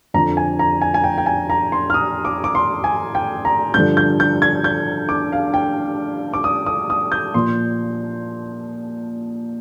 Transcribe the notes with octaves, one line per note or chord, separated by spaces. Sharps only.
F2 D3 F3 A#5
G#5
A#5
G#5
G#5
G5
G5
G#5
A#5
C6
F6
D#6
D6
D6
C6
G#5
G5
A#5
G2 D3 F3 G6
G6
G6
G#6
G6
D6
F5
G5
D6
D#6
D#6
D#6
G6
A#2 F3 C6